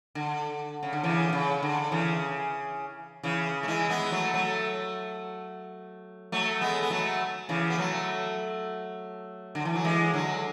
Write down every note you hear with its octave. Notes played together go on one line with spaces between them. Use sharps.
D3
C#3
D3
C#3 E3
B2
C#3
D3
C#3 E3
C#3 E3
A3
E3 G#3
G#3 B3
F#3 A3
F#3 A3
F#3 A3
G#3 B3
B3
F#3 A3
C#3 E3
B3
F#3 A3
D3
E3
F#3
E3 G#3
D3 F#3